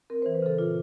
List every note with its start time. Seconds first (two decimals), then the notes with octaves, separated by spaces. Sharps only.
0.10 C4 A#4
0.22 E3 C5
0.34 B4
0.42 C#3 A4
0.58 A#2 F4